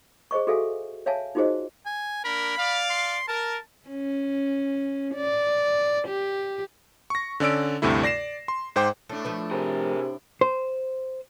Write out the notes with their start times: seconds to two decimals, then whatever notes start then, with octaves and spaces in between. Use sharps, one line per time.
0.31 G#4 C5 D#5 C#6
0.47 F#4 G#4 A4 E5 F5 G#5
1.06 C#5 E5 F5 G#5 A5
1.35 D#4 F4 F#4 G#4 C5 D#5
1.86 G#5
2.25 A#3 D4 A#4 B5
2.58 D5 F5
2.90 C6
3.28 A#4 A5
3.89 C#4
5.15 D5
6.07 G4
7.10 C#6 A#6
7.40 D3 C#4 D5 E6 D7
7.82 D2 G2 C3 A3 E4
8.03 D5 A#6 C7 E7
8.48 C6
8.76 G#2 C5 G5 D6
9.09 A2 A3 D4
9.25 F3 A3 B4
9.51 C3 G#4 A#4
10.41 C5